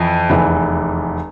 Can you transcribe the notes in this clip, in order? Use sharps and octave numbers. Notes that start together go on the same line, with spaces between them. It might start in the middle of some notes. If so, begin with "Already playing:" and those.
Already playing: F2 E3
F1 E2 E3